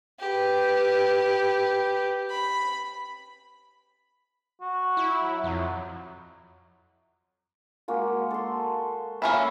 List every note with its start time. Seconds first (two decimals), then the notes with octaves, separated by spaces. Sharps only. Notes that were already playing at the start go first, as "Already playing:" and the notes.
0.20 G4 B4
2.30 B5
4.61 F#4
4.97 E4
5.22 F#3
5.44 F2 F#3
7.88 G#3 A#3 F#4
8.30 A4 C6
9.22 A#3 C#4 E4